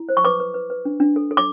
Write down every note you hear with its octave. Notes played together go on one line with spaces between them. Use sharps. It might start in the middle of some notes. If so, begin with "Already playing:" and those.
Already playing: E4
C5
C#6
B4 D6
B4
B4
B4
D4
D4
A4
A4
D6